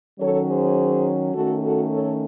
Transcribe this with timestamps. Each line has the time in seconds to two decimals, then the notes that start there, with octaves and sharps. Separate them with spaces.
0.20 D#3 F#3 C#4 A4 C#5
0.48 G#4 C5
1.34 D#3 A3 C#4 F#4 A4
1.62 F#4 A4
1.91 A4 C#5